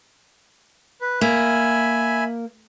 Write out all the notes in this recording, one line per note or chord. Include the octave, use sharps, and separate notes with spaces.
B4
A#3 E5 G#5 B5